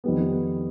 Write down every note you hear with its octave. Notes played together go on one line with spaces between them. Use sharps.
F2 D#3 G3 B3